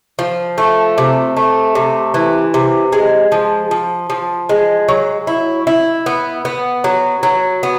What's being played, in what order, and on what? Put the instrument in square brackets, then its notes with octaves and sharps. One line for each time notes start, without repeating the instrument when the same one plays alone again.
[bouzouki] F3
A3
C3
A3
C3
E3
C3
G#3
F3
F3
F3
G#3
F#3
E4
E4
B3
B3
F#3
F#3
B3